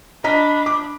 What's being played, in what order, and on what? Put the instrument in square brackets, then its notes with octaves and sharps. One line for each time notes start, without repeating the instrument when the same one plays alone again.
[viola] D4 B5 [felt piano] D#5 A#5 B6
[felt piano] D6